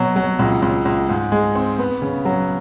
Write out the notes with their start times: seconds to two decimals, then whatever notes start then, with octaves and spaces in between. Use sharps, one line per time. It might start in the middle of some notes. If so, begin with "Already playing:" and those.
Already playing: B2 F#3
0.16 F#3
0.39 C#2
0.62 C#2
0.85 C#2
1.09 G#2
1.32 G#3
1.55 C4
1.79 B3
2.02 C#3
2.25 F#3